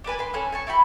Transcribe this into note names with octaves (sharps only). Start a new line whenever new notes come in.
D4 G4 B4 G#5
B4 C6
C#4 A4 G#5 F#6
G#5 A5 C#6
E4 F#4 G5 B5